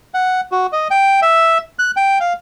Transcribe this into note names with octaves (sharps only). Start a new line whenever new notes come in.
F#5
F#4
D#5
G5
E5
F#6
G5
F5